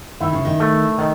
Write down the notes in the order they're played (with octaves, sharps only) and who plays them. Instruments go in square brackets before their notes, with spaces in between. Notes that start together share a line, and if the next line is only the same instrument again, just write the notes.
[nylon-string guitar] D#3 [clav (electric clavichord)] E4
[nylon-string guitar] C#3
D#3
[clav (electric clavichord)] A3
D#3